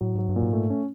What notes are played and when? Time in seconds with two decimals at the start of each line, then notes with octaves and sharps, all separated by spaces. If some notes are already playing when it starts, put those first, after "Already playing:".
0.01 A2 F#3
0.15 G#2 F#3
0.29 G2
0.36 A#2
0.43 G#2
0.53 A3
0.70 C#4